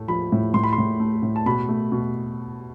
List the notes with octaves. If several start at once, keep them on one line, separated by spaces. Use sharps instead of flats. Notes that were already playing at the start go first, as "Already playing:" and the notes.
Already playing: A2 A3
F3 B5
A2
A2 C6
B5
C6
A2
A3
A2
A5
B2 B5
A3
B2